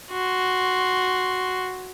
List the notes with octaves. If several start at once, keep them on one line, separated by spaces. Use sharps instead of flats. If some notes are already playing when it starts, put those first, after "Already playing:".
F#4 C6